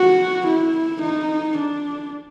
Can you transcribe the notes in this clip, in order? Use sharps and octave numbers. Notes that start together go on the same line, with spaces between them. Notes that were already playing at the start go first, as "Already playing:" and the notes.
Already playing: F#4
E4
D#4
D4